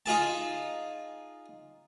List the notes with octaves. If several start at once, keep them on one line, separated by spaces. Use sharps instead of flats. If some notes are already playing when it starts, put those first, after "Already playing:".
D#4 F4 G#4 A5